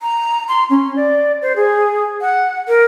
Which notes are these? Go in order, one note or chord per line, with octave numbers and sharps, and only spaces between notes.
A#5
C6
C#4
D5
C5
G#4
F#5
A#4